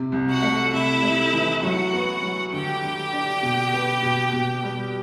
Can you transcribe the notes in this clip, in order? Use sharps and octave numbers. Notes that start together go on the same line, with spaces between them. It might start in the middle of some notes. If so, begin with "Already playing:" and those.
Already playing: C3
C2
F#4 F#5
A3
C3 E4 E5
A3
E3
F#3 F#4 F#5
B3
F#3
D3 G4 G5
D3
D4
B2
B3
B2
B2
G3